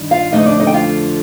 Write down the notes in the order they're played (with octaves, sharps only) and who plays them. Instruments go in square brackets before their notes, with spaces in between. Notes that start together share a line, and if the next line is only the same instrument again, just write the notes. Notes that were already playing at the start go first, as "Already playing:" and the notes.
Already playing: [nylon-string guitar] G2 D#3
F4 F5
F2 D3 A3 D#4 D#5
D4 D5
D#4 D#5
G5
F4 F5